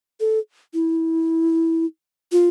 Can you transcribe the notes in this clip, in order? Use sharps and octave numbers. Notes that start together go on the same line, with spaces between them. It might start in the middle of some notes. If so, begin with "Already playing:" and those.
A4
E4
F4